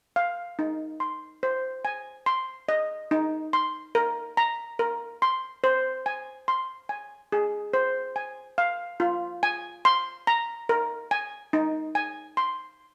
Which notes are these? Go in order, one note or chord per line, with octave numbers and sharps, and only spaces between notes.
F5
D#4
C6
C5
G#5
C6
D#5
D#4
C6
A#4
A#5
A#4
C6
C5
G#5
C6
G#5
G#4
C5
G#5
F5
F4
G#5
C6
A#5
A#4
G#5
D#4
G#5
C6